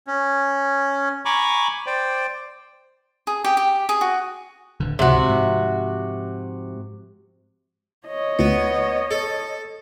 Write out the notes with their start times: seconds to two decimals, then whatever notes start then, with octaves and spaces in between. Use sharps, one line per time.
0.07 C#4
1.25 G#5 A#5 B5 C#6 D6
1.86 C5 D5 G5
3.27 G#4
3.44 G4
3.57 G4
3.89 G#4
4.01 F#4
4.80 D1 D3
4.99 C#2 G#2 C3 F3 F#4
5.29 G#2 F3
8.07 C#5 D#5
8.39 D2 B3
9.11 A4